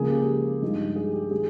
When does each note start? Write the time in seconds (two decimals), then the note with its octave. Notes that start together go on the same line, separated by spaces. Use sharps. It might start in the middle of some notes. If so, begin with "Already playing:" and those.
Already playing: C#2 C#3 F3 A#3 G#4
0.09 G4
0.62 G2 F3 G#3 D#4
0.96 G#4
1.13 G4
1.31 D#3 G#3 G#4